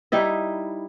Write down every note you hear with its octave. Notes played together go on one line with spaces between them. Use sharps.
G3 D#4 E4 D#5